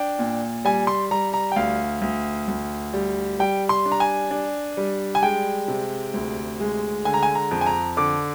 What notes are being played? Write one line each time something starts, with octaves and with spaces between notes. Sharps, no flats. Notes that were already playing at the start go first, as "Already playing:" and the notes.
Already playing: D4 G5
A#2
G3 G#5
C6
G3 A#5
A#5
G5
D2 F5
D2
D2
G3
G3 G5
C6
D4
A#5
G#5
D4
G3
G#5
G#3 G5
C3
D2
G#3
D3 G#5
A#5
G#5
A#5
F2
G#5
A#5
D3 D6